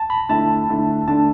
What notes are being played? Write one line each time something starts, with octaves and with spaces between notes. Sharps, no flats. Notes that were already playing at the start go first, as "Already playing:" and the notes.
Already playing: A5
B5
D3 A3 E4 A5
D3 A3 E4
D3 A3 D4 A5